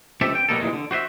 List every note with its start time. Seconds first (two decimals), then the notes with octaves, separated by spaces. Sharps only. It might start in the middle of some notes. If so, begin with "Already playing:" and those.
0.21 C#2 C4 G4 A4 E5
0.35 G5
0.49 B2 F#3 G3 A#3 D#4 A4
0.60 C2 A#2 D3 E3 G#3
0.73 D3
0.91 F#4 C5 D#5 E5